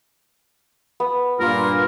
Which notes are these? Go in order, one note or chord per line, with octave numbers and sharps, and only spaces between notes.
B3
G2 A#2 F4 A#4